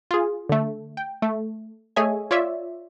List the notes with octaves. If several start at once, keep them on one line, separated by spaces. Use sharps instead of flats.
F4 G#4
D3 A3
G5
A3
A3 G#4 C#5 D#5 E5 G#5
F4 C#5 D5 E5